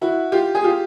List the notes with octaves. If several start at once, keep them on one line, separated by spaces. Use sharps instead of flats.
E4 F#4
F4 G4
G#4
F4 G4